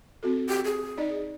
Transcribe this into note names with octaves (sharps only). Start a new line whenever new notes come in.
C4 F#4 A4
G4
G#4
D#4 D5 D#5